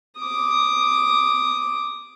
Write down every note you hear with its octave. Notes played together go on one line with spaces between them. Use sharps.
D6 D#6